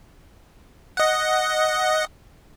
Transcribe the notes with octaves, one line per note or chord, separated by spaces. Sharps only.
D#5 F#5